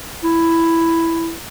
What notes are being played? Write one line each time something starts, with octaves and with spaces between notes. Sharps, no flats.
E4